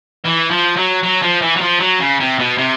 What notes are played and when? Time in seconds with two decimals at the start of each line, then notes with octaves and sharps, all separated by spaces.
0.25 E3
0.51 F3
0.77 F#3
1.03 F#3
1.22 F3
1.42 E3
1.57 F#3
1.61 F3
1.80 F#3
2.00 C#3
2.20 C3
2.39 B2
2.58 C3